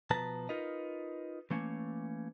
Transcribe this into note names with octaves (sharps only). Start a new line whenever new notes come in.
B2 F3 B4 A5 A#5
D#4 F4 A#4 B4 D#5
E3 A3 A#3 C#4